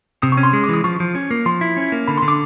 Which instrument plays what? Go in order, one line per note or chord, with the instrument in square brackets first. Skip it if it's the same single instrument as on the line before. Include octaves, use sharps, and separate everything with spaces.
[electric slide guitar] C3 [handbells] D#6
[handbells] C#6
[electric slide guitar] C#4
[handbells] C6
[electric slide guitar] G#3
[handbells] D6
[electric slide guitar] E3 [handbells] D#6
[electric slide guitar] F3 [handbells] C#6
[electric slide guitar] F3
C#4
A#3
[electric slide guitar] F3 [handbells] C6
[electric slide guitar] E4
C#4
A#3
[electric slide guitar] D3 [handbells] B5
[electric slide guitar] D3 [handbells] C6
[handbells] D6